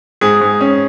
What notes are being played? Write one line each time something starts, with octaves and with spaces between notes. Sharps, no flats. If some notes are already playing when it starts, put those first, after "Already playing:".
G#2 G#4
G#2
C#4